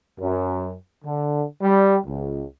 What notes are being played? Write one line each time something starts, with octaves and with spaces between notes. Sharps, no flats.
F#2
D3
G3
C#2